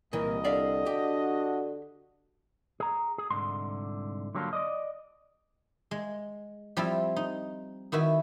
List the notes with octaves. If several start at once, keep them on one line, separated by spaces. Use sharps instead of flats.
C2 A#2 E3 A#4 D#5
D3 D5 E5 F5
D4 F#4 G4
G#4 A#5
G#4
C2 G#2 D3 C6
D3 F#3 G3 A#3 D4 F4
D5 D#5
G#3
F3 G3 C4 E4 F4
D#4
D#3 E4 F#4 B4